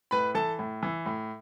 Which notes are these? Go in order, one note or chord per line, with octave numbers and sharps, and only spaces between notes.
A2 B4 B5
E3 A4 A5
A2
E3
A2